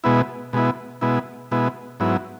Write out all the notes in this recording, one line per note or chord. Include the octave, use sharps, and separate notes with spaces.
B2 G#3 B3 E4
B2 G#3 B3 E4
B2 G#3 B3 E4
B2 G#3 B3 E4
G#2 F#3 B3 E4